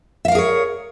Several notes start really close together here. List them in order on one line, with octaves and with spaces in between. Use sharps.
E5 F5 A#4 G#4 C#5